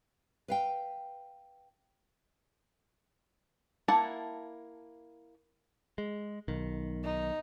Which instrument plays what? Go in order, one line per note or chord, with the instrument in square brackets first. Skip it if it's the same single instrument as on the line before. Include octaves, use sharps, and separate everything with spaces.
[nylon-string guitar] B4 F5 G5
[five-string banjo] A#3 E4 F#5 A5
[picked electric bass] G#3
B1 D#3
[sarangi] D#4